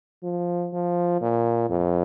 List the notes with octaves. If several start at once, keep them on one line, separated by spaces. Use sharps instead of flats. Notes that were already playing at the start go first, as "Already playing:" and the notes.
F3
F3
A#2
F2